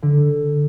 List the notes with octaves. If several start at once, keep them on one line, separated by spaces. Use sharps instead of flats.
D3